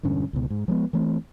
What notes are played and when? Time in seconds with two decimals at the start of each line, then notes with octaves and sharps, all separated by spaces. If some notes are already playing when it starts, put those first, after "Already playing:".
0.03 E1 G2 D3 C#4
0.33 C#2 B2
0.50 G#2
0.68 F3 G#3 B3
0.93 E3 A3 C4